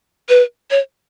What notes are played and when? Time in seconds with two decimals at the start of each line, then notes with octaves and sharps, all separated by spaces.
0.29 B4
0.71 C#5